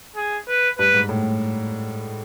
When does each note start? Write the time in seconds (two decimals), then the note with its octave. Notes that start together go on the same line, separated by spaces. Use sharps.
0.16 G#4
0.48 B4
0.79 G2 B4
0.94 G#2
1.09 A2